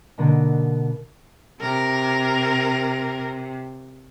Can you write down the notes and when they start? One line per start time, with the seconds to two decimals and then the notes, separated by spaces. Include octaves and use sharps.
0.18 B2 D3 A#3 B3
1.61 C3 A#4